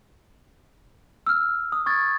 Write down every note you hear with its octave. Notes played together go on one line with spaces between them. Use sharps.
E6 F6
D#6
C#6 G#6 A6